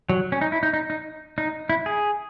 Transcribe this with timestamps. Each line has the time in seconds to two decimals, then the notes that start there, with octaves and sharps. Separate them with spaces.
0.10 F#3
0.32 C#4
0.41 D#4
0.52 E4
0.63 D#4
0.73 D#4
0.90 D#4
1.38 D#4
1.69 E4
1.86 G#4